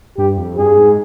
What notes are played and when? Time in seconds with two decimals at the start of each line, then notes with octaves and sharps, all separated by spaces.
0.18 G2 G4
0.37 F2
0.58 G2 G#4
0.77 G#2